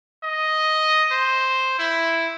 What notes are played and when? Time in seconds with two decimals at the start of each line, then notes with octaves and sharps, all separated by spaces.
0.24 D#5
1.11 C5
1.79 E4